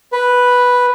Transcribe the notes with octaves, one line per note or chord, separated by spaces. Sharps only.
B4